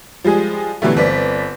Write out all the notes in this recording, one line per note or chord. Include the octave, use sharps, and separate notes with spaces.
F3 G3 G#3 G#4
B2 D3 E3 F#3 G3 A3
G1 C4 B4 D5 B6